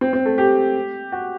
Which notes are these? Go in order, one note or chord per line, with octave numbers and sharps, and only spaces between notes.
C4
C4
A3
G4
F#4